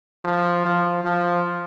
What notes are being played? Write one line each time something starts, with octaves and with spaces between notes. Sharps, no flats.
F3
F3
F3